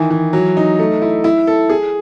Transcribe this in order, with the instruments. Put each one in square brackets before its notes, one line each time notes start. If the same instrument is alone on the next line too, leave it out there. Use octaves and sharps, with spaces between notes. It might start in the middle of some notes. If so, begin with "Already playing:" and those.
Already playing: [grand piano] D#3 E3
E3
F#3
D#4
A3
E4
E4
A4
G#4